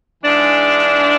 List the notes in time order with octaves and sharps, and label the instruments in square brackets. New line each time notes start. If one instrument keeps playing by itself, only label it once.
[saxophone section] G#2 E3 G#3 D4